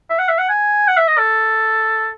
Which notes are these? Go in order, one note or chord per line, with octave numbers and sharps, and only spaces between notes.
E5
F#5
E5
F#5
G#5
F#5
E5
D#5
A4